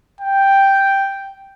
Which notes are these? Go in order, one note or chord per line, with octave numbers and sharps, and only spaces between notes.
G5